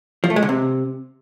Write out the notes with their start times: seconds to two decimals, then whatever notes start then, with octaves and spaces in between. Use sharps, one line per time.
0.24 F3
0.30 A3
0.36 G#3
0.43 D3
0.49 C3